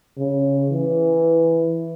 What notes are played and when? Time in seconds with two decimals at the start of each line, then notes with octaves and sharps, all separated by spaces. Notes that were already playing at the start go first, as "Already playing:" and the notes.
0.18 C#3
0.70 E3